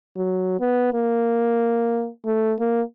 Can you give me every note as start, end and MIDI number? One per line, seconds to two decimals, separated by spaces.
0.17 0.55 54
0.60 0.93 59
0.93 2.08 58
2.25 2.53 57
2.60 2.82 58